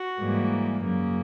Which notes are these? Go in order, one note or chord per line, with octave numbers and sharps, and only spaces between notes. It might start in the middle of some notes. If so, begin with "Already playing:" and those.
Already playing: F#4
G#2 E3 G3 A#3
F#2 C#3 F#3 A#3